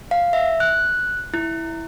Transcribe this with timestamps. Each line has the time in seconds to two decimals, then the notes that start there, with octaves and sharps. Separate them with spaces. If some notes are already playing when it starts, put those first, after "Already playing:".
0.11 F5
0.33 E5
0.60 F#6
1.34 E4